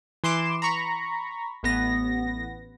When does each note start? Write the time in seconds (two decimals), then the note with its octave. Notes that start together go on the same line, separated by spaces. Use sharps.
0.24 E3 C6 D6 E7
0.62 A#5 B5 C#6
1.63 A1 B3 A#6